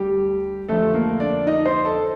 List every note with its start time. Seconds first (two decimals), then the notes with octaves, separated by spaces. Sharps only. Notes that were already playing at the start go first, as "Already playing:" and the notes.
Already playing: D2 D3 G3 G4
0.68 F2 D3 F3 A3 A4
0.94 A#3 A#4
1.20 D4 D5
1.47 D#4 D#5
1.66 C5 C6
1.85 A4 A5